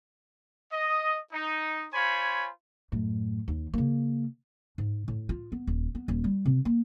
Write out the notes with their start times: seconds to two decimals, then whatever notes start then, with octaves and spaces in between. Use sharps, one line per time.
0.72 D#5
1.33 D#4
1.94 F4 C5 C#5 G#5 B5
2.92 F#2 A2
3.48 D#2
3.74 C#3 A#3
4.78 G#2
5.08 A2
5.29 F4
5.52 B3
5.67 D#1
5.95 B3
6.08 D#1
6.24 G3
6.46 C3
6.65 A#3